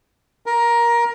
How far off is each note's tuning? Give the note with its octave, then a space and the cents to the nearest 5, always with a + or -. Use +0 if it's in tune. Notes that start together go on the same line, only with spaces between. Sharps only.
A#4 +15